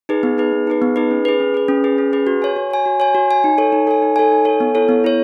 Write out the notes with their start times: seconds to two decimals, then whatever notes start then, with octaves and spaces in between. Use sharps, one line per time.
0.09 D#4 G#4 B4
0.23 B3
0.38 D#4 G#4 B4
0.52 B3
0.67 D#4 G#4 B4
0.82 B3
0.96 D#4 G#4 B4
1.11 C#4
1.25 G#4 B4
1.40 C#4
1.54 G#4 B4
1.68 C#4
1.84 G#4 B4
1.98 C#4
2.13 G#4 B4
2.27 F#4
2.42 C#5 G#5
2.56 F#4
2.71 C#5 G#5
2.86 F#4
3.00 C#5 G#5
3.15 F#4
3.30 C#5 G#5
3.44 D#4
3.58 A4 C#5 G#5
3.72 D#4
3.87 A4 C#5 G#5
4.02 D#4
4.16 A4 C#5 G#5
4.31 D#4
4.45 A4 C#5 G#5
4.60 B3
4.75 E4 A4 C#5
4.89 B3
5.04 E4 A4 C#5